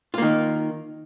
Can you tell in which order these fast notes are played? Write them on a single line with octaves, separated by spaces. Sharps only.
F4 A#3 D#3